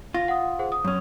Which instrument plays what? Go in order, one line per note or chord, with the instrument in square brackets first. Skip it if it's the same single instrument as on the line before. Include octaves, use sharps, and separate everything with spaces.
[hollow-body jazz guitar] F4 [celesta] A#6
[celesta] F#5 D#6
G#4 C5 F#5
D#6
[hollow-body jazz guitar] F#2 C#4